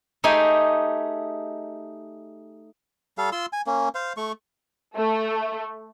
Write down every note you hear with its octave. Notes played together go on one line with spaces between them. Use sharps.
A3 D#4 G4 G#4 G5 G#5
G3 A4 F5
F4 C6 E6
G#5
A#3 C#4
C5 F5
A3 C#6
A3